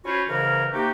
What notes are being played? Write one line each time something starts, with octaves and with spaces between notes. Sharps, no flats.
C#4 F4 F#4 C5 C#5 B5
G#2 C#3 E3 A#4
C3 A#3 D#4 F#4 G4